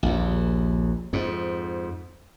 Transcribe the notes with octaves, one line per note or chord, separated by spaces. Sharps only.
A#1 D#2
F2 G#2